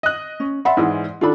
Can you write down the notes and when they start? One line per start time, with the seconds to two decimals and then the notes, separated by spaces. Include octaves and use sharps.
0.03 D#5 F#6
0.40 C#4
0.65 D5 E5 F#5 B5 C6
0.77 G#2 E3 G#3
1.21 D#3 D4 F4 A4 B5